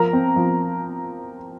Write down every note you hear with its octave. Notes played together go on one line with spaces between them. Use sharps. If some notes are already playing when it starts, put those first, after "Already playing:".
Already playing: F3 A#4 A#5
C4
F3